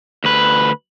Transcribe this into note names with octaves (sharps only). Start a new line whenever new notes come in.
D2 B4